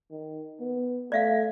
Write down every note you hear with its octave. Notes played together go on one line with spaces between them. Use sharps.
D#3
B3
A3 D5 E5 F5